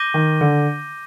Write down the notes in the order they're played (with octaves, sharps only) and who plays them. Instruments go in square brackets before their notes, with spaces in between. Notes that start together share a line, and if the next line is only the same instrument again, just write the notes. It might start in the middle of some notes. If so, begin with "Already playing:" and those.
Already playing: [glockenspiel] D6 G6 A#6 D#7 G7
[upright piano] D#3
D3